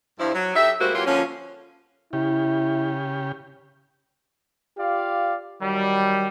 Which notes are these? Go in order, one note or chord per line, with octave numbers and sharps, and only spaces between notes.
G2 F3 E4
F#3
D#4 G4 A4 E5
G#2 G3 A3 A#3 F#4 C5
E3 F#3 A#3 F4 G4 C#5
D3 F3 A#3 C#4
C#3 E4 G4
F4 G4 D5 F5
D#3 F#3 G3